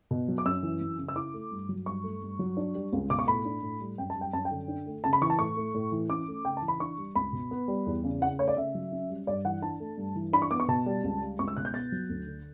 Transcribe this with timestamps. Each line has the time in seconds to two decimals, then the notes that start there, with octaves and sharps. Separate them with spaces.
0.11 B2
0.28 F#3
0.38 D6
0.45 F#2 E6
0.63 E3
0.81 F#2
0.98 C#3
1.08 E6
1.16 E4 D6
1.34 A3
1.51 G2
1.69 F#3
1.86 G2 C#6
2.03 A3
2.22 G2
2.39 F#3
2.57 D4
2.75 G3
2.93 C#2
3.10 B2 D6
3.19 C#6
3.27 A2 B5
3.45 D4
3.62 A2
3.80 G3
3.98 F#2 G5
4.10 A5
4.15 G3
4.21 G5
4.33 F#2 A5
4.45 G5
4.51 D3
4.68 D4
4.86 A3
5.04 C#3 A5
5.13 B5
5.21 E3 C#6
5.30 A5
5.39 A2 C#6
5.57 A3
5.74 A2
5.92 E3
6.10 C#4 D6
6.28 A3
6.45 C#3 G5
6.57 A5
6.62 E3
6.68 B5
6.80 D4 C#6
6.98 G3
7.16 C#2 B5
7.33 B2
7.51 B3
7.68 G3
7.86 E2
8.04 C#3
8.21 C#3 F#5
8.39 A3 C#5
8.48 D5
8.56 C#3 E5
8.75 F#3
8.92 C#4
9.10 G3
9.27 G2 D5
9.45 E3 F#5
9.62 D4 A5
9.80 A3
9.97 G2
10.15 E3
10.33 D4 B5
10.42 C#6
10.51 B3 D6
10.60 C#6
10.68 B2 A5
10.86 G3
11.04 C#2
11.21 G3
11.39 C#2 C#6
11.48 E6
11.57 B2 F#6
11.65 G6
11.74 B3 A6
11.92 F#3
12.09 D2
12.27 D3